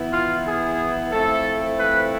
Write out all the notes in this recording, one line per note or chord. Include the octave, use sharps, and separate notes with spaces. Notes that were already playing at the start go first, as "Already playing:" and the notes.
Already playing: E3 B3 E4
F4
G#4
F3 A3 C4 E4 A4
B4